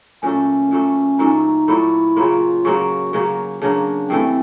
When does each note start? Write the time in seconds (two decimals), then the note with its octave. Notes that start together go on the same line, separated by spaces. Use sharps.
0.23 A#2 F#3 A3 C#4
0.71 A#2 F#3 A3
1.19 A#2 F#3 A3 D#4
1.68 A#2 F#3 A3 E4
2.16 C#3 F#3 A#3 F4
2.65 C#3 F#3 A#3 F#4
3.13 C#3 F#3 A#3
3.62 C#3 F#3 A#3 D4
4.10 G2 E3 A3 C4